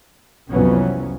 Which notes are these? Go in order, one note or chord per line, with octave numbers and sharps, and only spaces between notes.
C2 F2 E3 F#3 B3 C#4